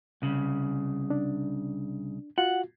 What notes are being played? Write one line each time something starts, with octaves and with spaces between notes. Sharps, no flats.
C2 C#3
D4
F4 F#4 F#5